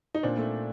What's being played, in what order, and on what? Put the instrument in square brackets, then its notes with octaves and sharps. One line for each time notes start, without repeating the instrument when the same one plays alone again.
[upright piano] D#4
[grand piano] A#2 [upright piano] C4 D4
[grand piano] A3